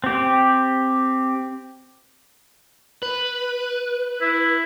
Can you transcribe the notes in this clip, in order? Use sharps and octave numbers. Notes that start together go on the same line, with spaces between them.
C4 G4
B4
E4